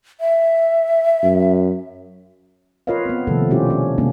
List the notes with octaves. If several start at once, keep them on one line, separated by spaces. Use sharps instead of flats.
E5
F#2
F4 A#4 B4 C#5 D#5 F5
B3 C4
C3 D#3 F3 A3 A#3 A4
B2 G3 C#4 E4 F4 G4
C#4 D4
C3 G#3 A#3 B3 C#4 D4